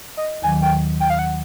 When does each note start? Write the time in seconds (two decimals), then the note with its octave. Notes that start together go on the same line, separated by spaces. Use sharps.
0.17 D#5
0.42 D#2 D#3 F#3 G#5
0.62 G5
1.00 G5
1.10 F5
1.19 F#5